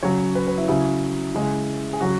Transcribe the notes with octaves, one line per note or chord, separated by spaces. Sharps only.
C#3 F#3 C#5
B4
B4
E4
C#3 F#3 E4
C#3 G#3
G#4
C#3 F#3 F#4